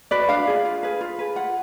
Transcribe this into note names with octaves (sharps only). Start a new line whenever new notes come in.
F#4 B4 D5
D4 F5
F4 G#4
F4
G#4 B4
F4
G#4 B4
F4 F#5